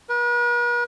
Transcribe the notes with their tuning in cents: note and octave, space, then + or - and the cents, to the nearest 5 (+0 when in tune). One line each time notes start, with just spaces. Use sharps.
B4 -45